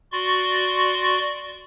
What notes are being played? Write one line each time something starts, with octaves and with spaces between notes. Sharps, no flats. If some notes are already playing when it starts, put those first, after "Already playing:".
F#4 D5 C6 C#6